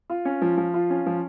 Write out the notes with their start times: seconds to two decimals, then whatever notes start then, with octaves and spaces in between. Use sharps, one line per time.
0.10 F4
0.25 C#4
0.42 F3
0.57 F3
0.74 F4
0.90 C#4
1.06 F3